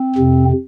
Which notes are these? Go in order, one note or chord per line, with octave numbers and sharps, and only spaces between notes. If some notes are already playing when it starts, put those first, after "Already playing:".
Already playing: C4
F2 C3